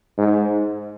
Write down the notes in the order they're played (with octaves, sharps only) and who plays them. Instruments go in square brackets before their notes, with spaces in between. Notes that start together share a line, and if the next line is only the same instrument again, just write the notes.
[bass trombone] G#2